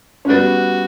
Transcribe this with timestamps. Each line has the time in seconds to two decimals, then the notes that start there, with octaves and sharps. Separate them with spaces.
0.25 C#4
0.29 G3 A3 B3 D4 F#4